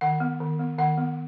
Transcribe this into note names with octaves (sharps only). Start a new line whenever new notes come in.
D#3 F#5
B3
D#3
B3
D#3 F#5
B3